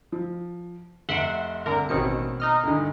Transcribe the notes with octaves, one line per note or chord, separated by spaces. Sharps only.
F3
F1 E5 F#5 C6 D7
C2 D3 A#4
A1 B2 D#3 C4 C#4 C#7
D#4 D#5 F6
D2 G2 D#3